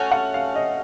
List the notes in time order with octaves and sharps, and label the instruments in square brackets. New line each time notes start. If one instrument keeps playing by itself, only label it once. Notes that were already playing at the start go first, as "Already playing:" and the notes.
Already playing: [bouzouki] A3 C#4 F#4 [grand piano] A5
[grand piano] F#5
F5
D#5